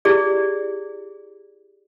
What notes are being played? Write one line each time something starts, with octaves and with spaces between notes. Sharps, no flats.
E4 G4 G#4 D5